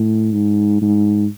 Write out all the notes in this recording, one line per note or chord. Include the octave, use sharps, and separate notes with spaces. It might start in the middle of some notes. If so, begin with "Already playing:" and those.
Already playing: A2
G#2
G#2